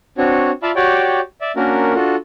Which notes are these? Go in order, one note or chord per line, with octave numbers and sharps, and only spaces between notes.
C4 D4 F#4 C#5
F4 D5 E5 F5 A5 B5
F#4 G4 C#5 D5 G5
D5 E5
A#3 C#4 D4 F#4 A#4
D4 F4 F#4 A4